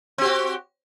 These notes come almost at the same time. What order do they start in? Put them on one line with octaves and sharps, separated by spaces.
C4 G4 F#4